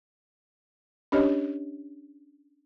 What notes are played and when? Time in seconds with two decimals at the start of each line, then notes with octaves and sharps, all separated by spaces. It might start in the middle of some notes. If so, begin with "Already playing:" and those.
1.12 C#4 D4 G4 C#5 D#5